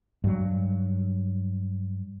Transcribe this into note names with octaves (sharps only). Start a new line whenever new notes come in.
G2 F#3